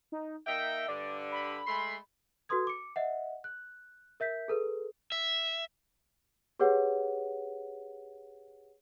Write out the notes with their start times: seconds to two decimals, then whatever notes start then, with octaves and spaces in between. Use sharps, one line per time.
0.12 D#4
0.46 A#3 D#4 E5 G5
0.88 G2 D3 D5
1.32 B5
1.67 G#3 A3 C6
2.49 F#4 A4 B4 C6 D#6 G#6
2.67 D6 C#7
2.96 D#5 E5 F#5
3.44 F#6
4.20 A#4 E5 G6 B6
4.48 G#4 A4 B4
5.12 E5
6.59 G4 G#4 B4 C#5 F#5